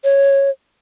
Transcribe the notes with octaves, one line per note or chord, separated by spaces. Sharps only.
C#5